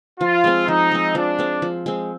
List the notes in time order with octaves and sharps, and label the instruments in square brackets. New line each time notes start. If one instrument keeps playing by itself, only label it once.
[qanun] F3 [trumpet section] F4
[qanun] G#3 C4
[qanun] F3 [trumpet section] D#4
[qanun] G#3 C4
[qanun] F3 [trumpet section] D4
[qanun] G#3 C4
F3
G#3 C4